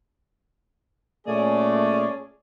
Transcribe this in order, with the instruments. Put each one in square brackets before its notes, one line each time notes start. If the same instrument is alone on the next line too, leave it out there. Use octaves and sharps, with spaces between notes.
[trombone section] A#2 A3 [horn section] C#4 G#4 D5